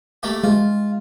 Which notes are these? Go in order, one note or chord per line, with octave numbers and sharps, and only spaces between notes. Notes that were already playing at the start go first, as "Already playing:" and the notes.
A3 A#3 G4
G#3 F4